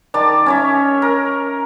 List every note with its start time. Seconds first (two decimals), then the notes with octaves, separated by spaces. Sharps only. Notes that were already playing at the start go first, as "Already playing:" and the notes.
0.14 D#3 D5 A5
0.46 C#4 C#5 E5
1.02 A#4